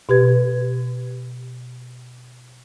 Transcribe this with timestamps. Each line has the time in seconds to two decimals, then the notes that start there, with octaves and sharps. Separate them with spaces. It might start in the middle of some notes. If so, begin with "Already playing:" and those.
0.09 B2 G4 B4 G#6